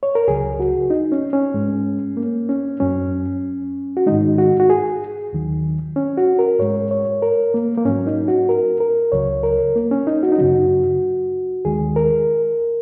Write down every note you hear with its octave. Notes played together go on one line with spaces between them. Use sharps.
C#5
A#4
C#2 C#3 F#3 G#4
F#4
D#4
C#4
C#4
G#2 G#3
A#3
C#4
F#2 F#3 C#4
F#4
G#2 D#3 G#3 D#4
F#4
F#4
G#4
D#2 D#3 F#3
C#4
F#4
A#4
G#2 G#3 C#5
C#5
A#4
A#3
A#3
G#2 F#3 C#4
D#4
F#4
A#4
A#4
C#2 C#3 F#3 C#5
A#4
A#3
C#4
D#4
F#4
D#4
F#2 C#3 F#3 F#4
D#2 D#3 G#3 G#4
A#4